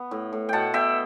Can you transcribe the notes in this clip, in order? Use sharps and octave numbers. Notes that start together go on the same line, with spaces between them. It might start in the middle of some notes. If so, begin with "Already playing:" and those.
Already playing: B3
A2
A2
B2 F#5 G5 A5
B2 E5 G5